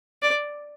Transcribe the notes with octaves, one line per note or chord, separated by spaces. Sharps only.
D5